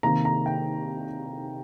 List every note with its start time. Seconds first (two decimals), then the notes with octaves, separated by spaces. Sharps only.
0.03 C3 D#3 A#3 A#5
0.25 A#5
0.46 G5